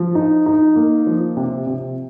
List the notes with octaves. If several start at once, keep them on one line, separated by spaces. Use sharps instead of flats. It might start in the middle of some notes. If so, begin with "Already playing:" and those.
Already playing: F3
D#4
D#4
A#3
F3
C3
C3